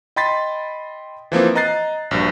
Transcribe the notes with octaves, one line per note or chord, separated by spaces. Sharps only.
D#5 G5 B5 C6 A6 B6
E3 F3 A#3 C4
D#5 A#5 F#6 A6 C7
A#1 G2 F#3